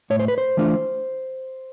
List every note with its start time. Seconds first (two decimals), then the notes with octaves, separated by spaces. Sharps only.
0.10 A2 C#5
0.19 C5
0.28 B4
0.38 C5
0.57 E3 A3 D4 F4